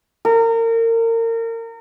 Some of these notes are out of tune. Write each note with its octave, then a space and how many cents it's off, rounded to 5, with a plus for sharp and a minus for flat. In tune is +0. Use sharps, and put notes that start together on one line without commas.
A#4 -30